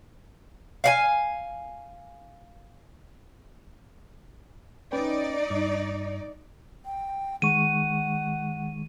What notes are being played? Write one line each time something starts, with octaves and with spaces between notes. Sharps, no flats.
F5 F#5 G#5
C#4 D#4 B4 D5 G5
G2
G5
D#3 G#3 F#5 C#6 D#7